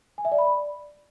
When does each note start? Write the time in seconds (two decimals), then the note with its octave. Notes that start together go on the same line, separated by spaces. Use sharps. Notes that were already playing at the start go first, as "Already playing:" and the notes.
0.18 G#5
0.25 E5
0.32 D5
0.39 B5
0.45 D5